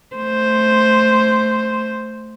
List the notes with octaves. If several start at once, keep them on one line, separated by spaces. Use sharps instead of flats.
A3 C5